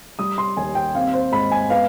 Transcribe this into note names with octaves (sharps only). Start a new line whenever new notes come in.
G3 D#6
C6
D#2 G#5
G5
C4 F5
C5
G#2 B5
G#5
B3 F5